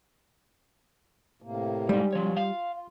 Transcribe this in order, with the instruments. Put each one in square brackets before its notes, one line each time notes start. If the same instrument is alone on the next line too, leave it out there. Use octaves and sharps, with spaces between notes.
[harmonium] A2 C3 A#3
[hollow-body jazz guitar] G3 [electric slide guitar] G#3 D#4
[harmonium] B2 C#4 F4 [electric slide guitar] F3 C#5
[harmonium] F4 [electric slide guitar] F5